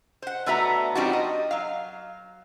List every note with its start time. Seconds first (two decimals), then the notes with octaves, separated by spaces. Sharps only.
0.22 C5 F#5
0.46 D3 A3 B3 F#4 E5 A#5
0.95 F3 G3 C4 D4 D#4 F#4
1.13 D#5
1.51 F#3 F5